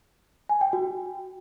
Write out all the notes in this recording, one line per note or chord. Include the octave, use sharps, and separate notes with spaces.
G#5
G5
F#4